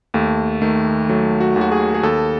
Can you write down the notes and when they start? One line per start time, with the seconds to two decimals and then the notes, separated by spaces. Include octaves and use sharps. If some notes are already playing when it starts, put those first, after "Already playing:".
0.14 D#2 A3
0.62 D#3 A3
1.09 F#3 A3
1.41 F#4
1.56 D#2
1.61 F#4
1.72 G#4
1.94 G#4
2.03 D#2 A4